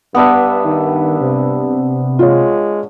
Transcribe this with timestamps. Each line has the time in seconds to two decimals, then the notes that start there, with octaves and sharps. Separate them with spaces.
0.15 G2 B3 D4 E5
0.64 D#3
1.21 C3
2.19 G#3 F4 C#5